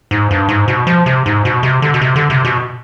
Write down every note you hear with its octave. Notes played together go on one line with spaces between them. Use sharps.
G#2
G2
G#2
B2
F3
C3
G#2
B2
C3
D3
B2
C3
D3
C3
B2